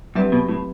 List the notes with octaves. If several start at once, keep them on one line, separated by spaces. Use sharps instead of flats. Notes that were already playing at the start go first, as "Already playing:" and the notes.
G2 F#3 C4 G4 B4 E5
B2
A2